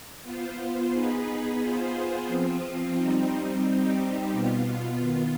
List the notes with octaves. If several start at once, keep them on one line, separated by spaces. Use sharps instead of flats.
B3 F4 C5
B3 D#4 G#4 B4
B3 F4 G#4 C5
F3 C4 F4
G3 C4 D#4
G3 C4 D#4 G4
B2 B3 F4
D#3 B3 F4